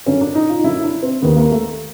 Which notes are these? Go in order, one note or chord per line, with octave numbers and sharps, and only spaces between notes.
F#2 D3 C#4
D4
D#4
F4
D#4
F#2 D3 E4
D4
C4
D#2 D#3 B3
A#3
A3